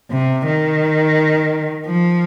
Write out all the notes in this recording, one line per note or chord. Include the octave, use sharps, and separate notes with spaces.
C3
D#3
F3